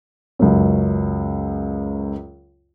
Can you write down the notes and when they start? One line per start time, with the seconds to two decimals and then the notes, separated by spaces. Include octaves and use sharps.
0.39 C#2 F#2